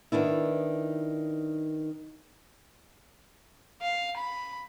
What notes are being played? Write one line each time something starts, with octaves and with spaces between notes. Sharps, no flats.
D#3 B3 D4 E4
F5
B5